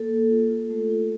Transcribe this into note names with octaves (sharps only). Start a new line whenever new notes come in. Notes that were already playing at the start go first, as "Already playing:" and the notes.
Already playing: A#3 A4
A#3
F4
F4
A3
F4